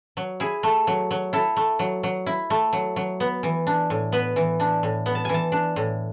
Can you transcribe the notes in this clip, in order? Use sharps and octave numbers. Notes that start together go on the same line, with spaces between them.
F#3
E4 G#4
A3
F#3
F#3
E4 A4
A3
F#3
F#3
E4
A3
F#3
F#3
B3
E3
D4
A2
B3 B4
E3
D4
A2
B3
A5
E3 G#5
A5
D4
A2